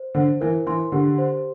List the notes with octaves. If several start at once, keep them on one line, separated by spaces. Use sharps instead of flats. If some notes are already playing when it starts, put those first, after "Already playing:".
Already playing: C5
D3 C5
E3 A#4
E3 C6
D3 G4
C5